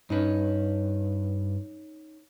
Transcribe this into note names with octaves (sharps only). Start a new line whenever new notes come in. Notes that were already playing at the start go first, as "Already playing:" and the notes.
G2 C#4 D#4 B4